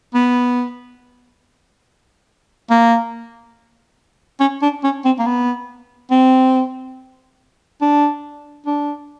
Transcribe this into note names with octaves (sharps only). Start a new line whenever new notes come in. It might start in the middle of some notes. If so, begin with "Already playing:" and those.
B3
A#3
C#4
D4
C#4
C4
A#3
B3
C4
D4
D4